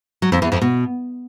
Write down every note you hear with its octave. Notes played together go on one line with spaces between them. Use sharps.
F#3
F2
E2
F2
B2